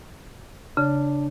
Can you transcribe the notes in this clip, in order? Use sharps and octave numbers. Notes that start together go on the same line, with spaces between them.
C#3 D4